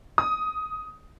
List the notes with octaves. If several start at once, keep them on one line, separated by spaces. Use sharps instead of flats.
D#6